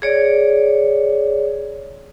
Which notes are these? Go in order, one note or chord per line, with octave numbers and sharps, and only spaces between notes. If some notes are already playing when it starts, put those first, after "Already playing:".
G#4 C#5 D5